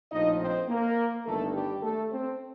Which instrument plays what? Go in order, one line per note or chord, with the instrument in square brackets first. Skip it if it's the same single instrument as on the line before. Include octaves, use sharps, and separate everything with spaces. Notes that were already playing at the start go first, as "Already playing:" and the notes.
[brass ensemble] A#1 A2 F3 D#4 D#5
C4 C5
A#3 A#4
G1 G2 D#3 A3 A4
G3 G4
A3 A4
C4 C5